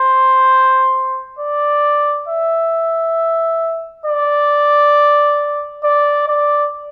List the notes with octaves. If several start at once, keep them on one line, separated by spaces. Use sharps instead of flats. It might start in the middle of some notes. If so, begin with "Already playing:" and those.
Already playing: C5
D5
E5
D5
D5
D5